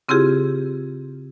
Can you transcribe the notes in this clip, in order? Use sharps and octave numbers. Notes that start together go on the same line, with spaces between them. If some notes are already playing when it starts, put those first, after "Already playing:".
C#3 C4 E4 F4 G4 G#4